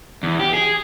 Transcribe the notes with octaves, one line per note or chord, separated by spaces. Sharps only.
E2
G4
G#4